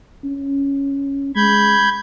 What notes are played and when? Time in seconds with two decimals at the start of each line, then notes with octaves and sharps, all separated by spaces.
0.24 C#4
1.36 G#3 B5 G6 G#6